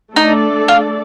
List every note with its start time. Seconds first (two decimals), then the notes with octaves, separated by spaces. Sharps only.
0.16 A3 D4 D#4 A4 D5
0.68 F4